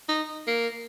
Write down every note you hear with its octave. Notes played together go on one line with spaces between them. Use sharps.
D#4
A#3